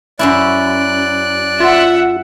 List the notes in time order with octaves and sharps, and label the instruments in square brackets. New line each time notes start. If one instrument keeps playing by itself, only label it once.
[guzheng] F#2 C#4 E4 [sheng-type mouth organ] D5 F#6
[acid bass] F4 [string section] E5 F#5